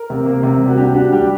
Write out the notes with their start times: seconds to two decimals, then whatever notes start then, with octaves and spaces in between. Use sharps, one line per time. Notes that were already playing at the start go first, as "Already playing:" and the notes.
Already playing: A#4
0.10 C3
0.26 A#3
0.43 C3
0.61 G3
0.68 F#4
0.77 D4 G4
0.94 D4 F#4
1.12 G3 G4